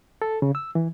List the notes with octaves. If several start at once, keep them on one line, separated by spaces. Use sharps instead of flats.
A4
C#3
E6
E3